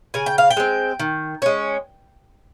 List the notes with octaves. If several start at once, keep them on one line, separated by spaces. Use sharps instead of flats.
C#3 G#5
G5
F5
G5
G#3 C4
D#3
G#3 C#4